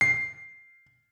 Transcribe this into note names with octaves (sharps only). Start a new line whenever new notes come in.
C7